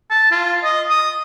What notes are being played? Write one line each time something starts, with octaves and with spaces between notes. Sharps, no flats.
A5
F4
D#5
D#6